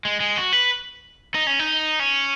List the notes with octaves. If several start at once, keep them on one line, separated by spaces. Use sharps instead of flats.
G#3
G#3
F#4
B4
D#4
C#4
D#4
C#4